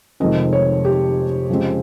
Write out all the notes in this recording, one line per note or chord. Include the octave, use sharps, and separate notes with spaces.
F1 F2 D#3 G#3 C4 D#5
C#5
G4
F2 C#3 G#3 C4